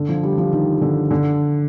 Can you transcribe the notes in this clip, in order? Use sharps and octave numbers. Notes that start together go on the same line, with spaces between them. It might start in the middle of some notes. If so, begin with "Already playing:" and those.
Already playing: D3
F3
G3
F3
D#3
D3
D3